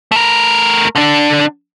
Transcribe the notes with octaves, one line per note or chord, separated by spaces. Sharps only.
A3 A#4
D3 D4